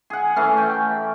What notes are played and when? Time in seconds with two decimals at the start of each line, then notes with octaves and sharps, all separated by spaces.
0.10 G#4 F#5
0.36 E3 A3 C#4
0.58 G5